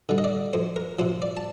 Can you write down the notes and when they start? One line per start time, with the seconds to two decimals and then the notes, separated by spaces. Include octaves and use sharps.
0.09 D3 G3
0.18 D#5
0.24 D5
0.53 F2 C5
0.76 A#4
0.99 C3 F3 C5
1.22 D5
1.37 A5